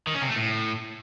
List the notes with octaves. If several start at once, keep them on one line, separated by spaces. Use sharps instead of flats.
D#3
C#4
C3
A3
A2